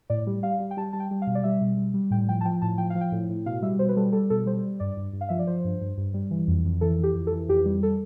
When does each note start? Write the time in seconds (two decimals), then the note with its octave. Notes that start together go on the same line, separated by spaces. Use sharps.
0.10 A2 D5
0.27 G3
0.43 G3 F5
0.60 G3
0.71 G5
0.77 G3 A5
0.93 G3 A5
1.00 G5
1.11 G3
1.22 F5
1.27 B2
1.35 D5
1.44 G3 E5
1.61 B2
1.77 G3
1.94 G3
2.11 A2 G5
2.28 F3 G5
2.41 A5
2.45 F3 G5
2.62 A2 A5
2.78 F3 G5
2.90 F5
2.95 F3
3.01 G5
3.12 A2
3.29 A2
3.46 B2 F5
3.62 G3 E5
3.79 B2 C5
3.89 B4
3.96 G3 A4
4.12 G3 A4
4.30 B2 A4
4.46 G3 C5
4.64 G3
4.80 G2 D5
4.97 G2
5.13 G2
5.21 F5
5.29 F3 E5
5.39 D5
5.47 F3 C5
5.65 G2
5.81 G2
5.97 G2
6.14 G3
6.31 E3
6.48 F2
6.65 F2
6.81 E3 A4
6.99 E3 G4
7.15 F2
7.27 A4
7.32 E3
7.49 F2 G4
7.66 G3
7.83 A4